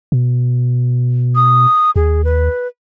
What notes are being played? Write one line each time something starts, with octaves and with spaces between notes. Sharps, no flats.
B2
D#6
D#2 G#4
B4